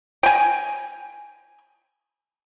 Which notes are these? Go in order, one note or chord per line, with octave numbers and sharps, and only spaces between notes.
G5 G#5